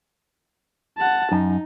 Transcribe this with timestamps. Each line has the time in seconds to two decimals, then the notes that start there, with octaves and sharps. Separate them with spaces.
0.97 F#5 A5
1.32 F#2 D#4